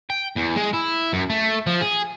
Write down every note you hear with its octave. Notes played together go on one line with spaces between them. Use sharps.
G5
E2
G#3
E4
F#2
A3
F3
G#4